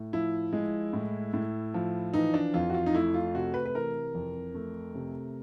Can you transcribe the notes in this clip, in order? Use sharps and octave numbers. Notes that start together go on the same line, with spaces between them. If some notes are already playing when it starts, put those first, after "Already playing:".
Already playing: A2
F3 E4
G#3
A2
A2
F3
E3 D#4
D4
F2 F4
F#4
F4
D#4
A3 E4
F4
C3 F#4
B4
B4
E3 A#4
F2
A3
C3